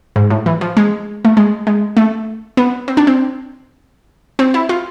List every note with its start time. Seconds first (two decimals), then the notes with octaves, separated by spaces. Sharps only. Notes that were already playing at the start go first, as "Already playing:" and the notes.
0.16 G#2
0.30 A2
0.46 E3
0.61 F3
0.77 G#3
1.25 A3
1.37 G#3
1.67 G#3
1.97 A3
2.57 B3
2.88 C4
2.97 D4
3.07 C4
4.39 C4
4.54 E4
4.69 F4